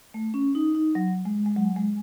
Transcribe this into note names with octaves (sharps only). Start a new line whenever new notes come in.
A3
C#4
D#4
D#4
F#3
G#3
G#3
F#3
G#3